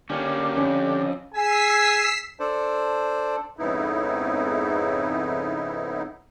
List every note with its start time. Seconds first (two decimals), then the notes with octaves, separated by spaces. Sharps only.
0.10 D3 A#3 C#4 D4 G4
0.57 F2 C#4
1.33 G#4 G#5 E6 B6 C7
2.40 D4 A4 C5 D5
3.57 F2 G#2 C#3 B3 D#4 E4